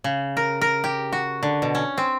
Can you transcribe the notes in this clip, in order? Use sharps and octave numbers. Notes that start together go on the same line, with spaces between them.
C#3
A#4
A#4
G4
F#4
D3
B2
C#4
C4